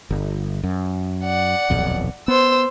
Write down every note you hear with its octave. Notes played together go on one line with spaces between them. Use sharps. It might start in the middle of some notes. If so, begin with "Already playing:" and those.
G1
F#2
D5 F#5
D#1 B1 F2
B3 C5 E6